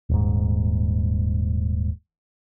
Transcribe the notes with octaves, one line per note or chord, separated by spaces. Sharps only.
D#1 G#2